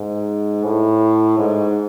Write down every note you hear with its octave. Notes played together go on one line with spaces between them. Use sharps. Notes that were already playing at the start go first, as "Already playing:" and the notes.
Already playing: G#2
A2
G#2